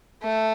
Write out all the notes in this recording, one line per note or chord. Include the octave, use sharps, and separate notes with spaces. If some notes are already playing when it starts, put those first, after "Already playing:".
A3